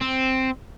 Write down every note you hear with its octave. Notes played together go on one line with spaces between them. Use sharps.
C4